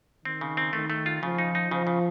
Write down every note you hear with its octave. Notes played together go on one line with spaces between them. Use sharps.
D#3 C4
C#3
C4
D#3 A3
A3
F4
C#3 F3
D#4
D#4
C#3 F3
C#3